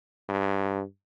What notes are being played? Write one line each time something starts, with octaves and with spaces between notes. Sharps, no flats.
G2